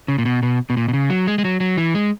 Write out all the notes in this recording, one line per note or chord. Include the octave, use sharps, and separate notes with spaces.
C#3
A#2
B2
B2
B2
A#2
B2
C#3
F#3
G#3
G#3
F#3
F#3
E3
G#3